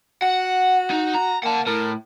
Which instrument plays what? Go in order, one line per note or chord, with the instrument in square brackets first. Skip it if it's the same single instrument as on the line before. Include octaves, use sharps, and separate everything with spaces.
[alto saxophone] F#4 [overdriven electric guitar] F#5
[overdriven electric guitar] D#4
A#5
[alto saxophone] A#3 [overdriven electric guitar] F#5 A5
[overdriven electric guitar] A2 [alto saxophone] A#4